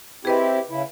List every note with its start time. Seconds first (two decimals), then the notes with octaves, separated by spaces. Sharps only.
0.25 C4 E4 G4 G#4 B4 D#5
0.70 C#3 E4